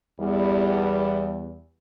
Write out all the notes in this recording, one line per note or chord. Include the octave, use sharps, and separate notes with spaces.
E2 G3